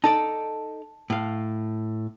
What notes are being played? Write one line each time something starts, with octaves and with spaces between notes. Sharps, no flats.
D#4 A4 D5 A5
A2 F5